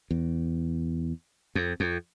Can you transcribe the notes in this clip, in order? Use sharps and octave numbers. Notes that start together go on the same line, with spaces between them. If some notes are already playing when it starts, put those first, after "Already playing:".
E2
F2
F2